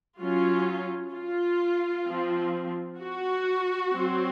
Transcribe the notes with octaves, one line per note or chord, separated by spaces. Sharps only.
F#3 C#4 F4
F4
F3 C4
F#4
F#3 C4